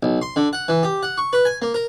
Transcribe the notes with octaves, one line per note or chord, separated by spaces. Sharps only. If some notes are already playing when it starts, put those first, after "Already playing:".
B1
C6
D3
F#5
E3
G4
F#5
C#6
B4
G#5
A#3
A#4